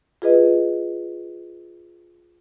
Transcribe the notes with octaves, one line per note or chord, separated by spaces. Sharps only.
F4 G#4 B4 D#5